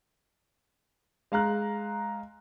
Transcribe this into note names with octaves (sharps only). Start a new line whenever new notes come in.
G#3 F5 A#5 F#6